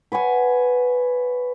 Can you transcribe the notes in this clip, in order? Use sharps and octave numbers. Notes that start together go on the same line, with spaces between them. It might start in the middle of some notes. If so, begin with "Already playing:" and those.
B4 C#5 F#5 G#5